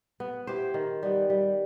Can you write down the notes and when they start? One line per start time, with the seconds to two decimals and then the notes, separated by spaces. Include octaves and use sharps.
0.20 B3
0.47 E4 G4 C5
0.74 D#3
1.03 G3 B3
1.30 G3